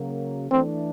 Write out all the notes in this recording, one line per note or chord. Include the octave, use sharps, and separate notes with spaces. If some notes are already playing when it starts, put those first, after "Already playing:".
Already playing: C#3 F#3 A#3
E3 A3 C4 D4